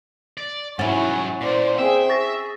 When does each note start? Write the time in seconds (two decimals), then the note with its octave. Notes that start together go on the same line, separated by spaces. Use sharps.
0.38 D5
0.79 G#2 F#3 C#4 E4 C#5 F#5 G#5 A6
1.41 A#2 C5 D5
1.79 C4 G#4 C5 E5 G5
2.09 G#4 C#6 A6 A#6